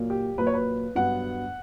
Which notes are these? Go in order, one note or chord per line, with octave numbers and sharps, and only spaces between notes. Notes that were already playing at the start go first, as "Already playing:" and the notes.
Already playing: A#2 F#3 A#3
G4
A#2 F#3 A#3 B4
C#5
B4
G2 F#3 B3 F#5